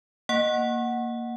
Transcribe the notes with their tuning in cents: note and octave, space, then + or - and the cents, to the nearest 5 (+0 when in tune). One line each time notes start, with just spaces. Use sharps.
A#3 +0 F#5 +0